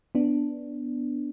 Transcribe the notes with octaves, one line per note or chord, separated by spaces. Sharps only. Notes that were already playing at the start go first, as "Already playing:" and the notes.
B3 D4